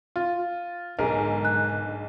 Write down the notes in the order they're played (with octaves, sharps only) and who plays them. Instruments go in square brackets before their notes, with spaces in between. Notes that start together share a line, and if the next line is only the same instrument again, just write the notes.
[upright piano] F4
[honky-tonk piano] B1 G#4 [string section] G#2 D3 [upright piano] A#4
[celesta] F#6